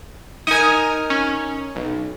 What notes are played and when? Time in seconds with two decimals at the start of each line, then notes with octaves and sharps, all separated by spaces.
0.47 D#4 A#4 G#5 D#6
1.10 C#4
1.75 B1